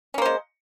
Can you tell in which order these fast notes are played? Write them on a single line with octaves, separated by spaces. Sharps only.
C#4 A#3 C5 G#3